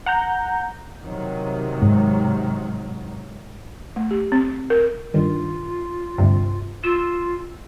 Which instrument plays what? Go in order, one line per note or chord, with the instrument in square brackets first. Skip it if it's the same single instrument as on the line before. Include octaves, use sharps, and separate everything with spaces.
[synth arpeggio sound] F#5 A#5 G6
[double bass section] C3 D#3 F#3
[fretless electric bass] G#2
[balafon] A3
G4
C4
A#4
[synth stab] G2 D#3 [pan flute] F4
[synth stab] D2 G2 C3
[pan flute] F4 [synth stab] E6